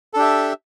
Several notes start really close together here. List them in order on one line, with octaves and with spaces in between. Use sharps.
A4 D4 G4 E5